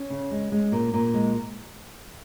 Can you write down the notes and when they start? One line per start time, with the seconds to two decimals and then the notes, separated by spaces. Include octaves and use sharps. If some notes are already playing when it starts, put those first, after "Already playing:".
Already playing: C#4
0.10 C#3
0.31 G#3
0.52 G#3
0.72 A#2
0.93 A#2
1.14 G#3